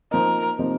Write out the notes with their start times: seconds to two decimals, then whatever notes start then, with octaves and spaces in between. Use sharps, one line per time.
0.11 F3 A#3 D#4 A#4
0.58 C3 F3 A#3 D#4